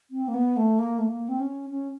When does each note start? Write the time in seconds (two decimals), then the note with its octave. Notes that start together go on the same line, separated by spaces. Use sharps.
0.11 C4
0.28 A#3
0.34 B3
0.57 A3
0.79 A#3
0.98 A3
1.09 A#3
1.29 C4
1.40 C#4
1.70 C#4